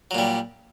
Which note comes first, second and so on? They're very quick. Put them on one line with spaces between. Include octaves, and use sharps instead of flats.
F#3 A#2 G3